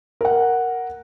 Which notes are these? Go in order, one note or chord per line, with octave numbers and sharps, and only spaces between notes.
A#4 F#5